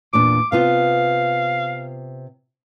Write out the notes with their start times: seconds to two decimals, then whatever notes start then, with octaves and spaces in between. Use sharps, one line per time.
0.13 E2 A#2 D4 D6
0.52 C3 B3 F4 F5